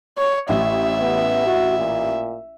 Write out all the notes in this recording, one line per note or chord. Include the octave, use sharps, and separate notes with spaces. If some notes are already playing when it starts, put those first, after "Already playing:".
C#5
A1 E5
B3
F#4
A#2